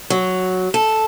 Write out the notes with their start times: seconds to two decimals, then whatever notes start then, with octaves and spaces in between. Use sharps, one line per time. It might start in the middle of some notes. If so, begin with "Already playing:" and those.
0.10 F#3
0.74 A4